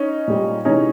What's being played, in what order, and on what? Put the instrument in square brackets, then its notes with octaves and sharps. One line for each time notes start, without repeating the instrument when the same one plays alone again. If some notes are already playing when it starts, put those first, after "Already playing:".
Already playing: [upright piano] C#4 D#4
A#2 G3
C3 E3 G#3 C#4 D#4